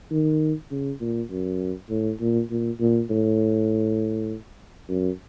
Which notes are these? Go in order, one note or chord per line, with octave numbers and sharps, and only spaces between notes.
D#3
C#3
A#2
F#2
A2
A#2
A#2
A#2
A2
F#2